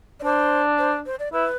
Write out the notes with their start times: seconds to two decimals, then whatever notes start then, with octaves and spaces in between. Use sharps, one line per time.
0.20 D5
0.24 D4 C5
0.78 C5
1.06 C5
1.19 D5
1.33 E4 B4